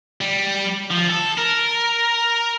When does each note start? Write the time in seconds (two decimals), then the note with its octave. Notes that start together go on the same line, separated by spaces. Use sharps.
0.21 G3
0.91 F3
1.10 A4
1.38 A#4